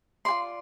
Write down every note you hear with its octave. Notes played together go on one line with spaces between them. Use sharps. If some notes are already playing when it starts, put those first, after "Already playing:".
F4 G#4 D5 C6